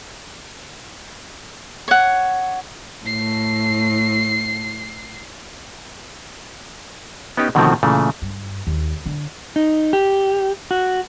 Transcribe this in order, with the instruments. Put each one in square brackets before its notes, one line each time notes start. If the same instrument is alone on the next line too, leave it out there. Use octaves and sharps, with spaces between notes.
[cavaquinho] C#5 F#5
[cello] A2 [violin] C7
[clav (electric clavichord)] B3 C#4 D#4 G4
B2 D3 D#3 F3 A3 C4
A#2 C#3 E3 A3
[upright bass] G2
D#2
D3
[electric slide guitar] D#4
G4
F#4